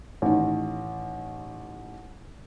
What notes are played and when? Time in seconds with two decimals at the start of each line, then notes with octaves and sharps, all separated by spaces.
0.22 A1 D#3